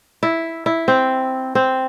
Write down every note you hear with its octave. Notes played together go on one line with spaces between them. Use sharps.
E4
E4
C4
C4